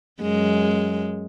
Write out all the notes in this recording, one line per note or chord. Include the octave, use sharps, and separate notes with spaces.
F#2 G#3